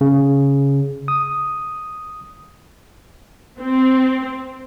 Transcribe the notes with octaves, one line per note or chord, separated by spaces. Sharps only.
C#3
D#6
C4